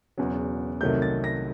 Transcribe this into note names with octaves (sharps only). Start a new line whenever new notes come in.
E1 E2 C#3 F#3
C2 C3 D#3 F#3 A3 G6
A6
A#6